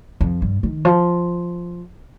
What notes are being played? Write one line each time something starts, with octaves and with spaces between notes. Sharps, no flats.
F2
G2
D#3
F3